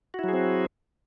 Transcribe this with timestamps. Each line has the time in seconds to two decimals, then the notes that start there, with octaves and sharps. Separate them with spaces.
0.14 F#4
0.19 E4
0.24 F#3
0.28 G#4
0.33 C4